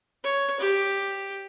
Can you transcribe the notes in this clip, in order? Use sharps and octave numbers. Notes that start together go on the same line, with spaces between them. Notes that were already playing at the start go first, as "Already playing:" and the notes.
C#5
G4